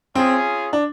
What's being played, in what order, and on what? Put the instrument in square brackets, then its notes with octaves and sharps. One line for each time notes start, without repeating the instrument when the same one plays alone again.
[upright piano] C4 [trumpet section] C#4 F4 G#4
[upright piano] D4